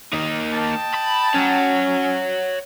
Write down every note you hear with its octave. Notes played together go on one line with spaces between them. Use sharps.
A#3 D#4
D#5 G5 A5
B5
C#4 C#5 F#5